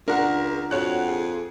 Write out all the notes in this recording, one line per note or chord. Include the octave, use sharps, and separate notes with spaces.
C#2 D4 A#4 F#5
F2 F#4 C#5 F#6
G#4